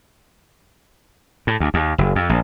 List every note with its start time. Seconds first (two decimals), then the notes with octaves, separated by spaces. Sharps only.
1.47 A2
1.60 D2
1.74 D#2
1.98 F#1
2.15 F2
2.29 A#1